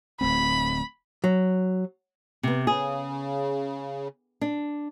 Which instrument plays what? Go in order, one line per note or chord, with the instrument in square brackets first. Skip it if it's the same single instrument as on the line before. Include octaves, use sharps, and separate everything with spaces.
[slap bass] D1 A3 C4 [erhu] B5
[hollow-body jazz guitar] F#3
[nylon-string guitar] C3 B3
[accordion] C#3 [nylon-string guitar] G#4
[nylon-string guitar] D4